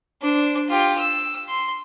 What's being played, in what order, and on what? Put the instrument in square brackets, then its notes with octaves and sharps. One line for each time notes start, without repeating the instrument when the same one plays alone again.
[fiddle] D4 C5
F4 G4
E6
C6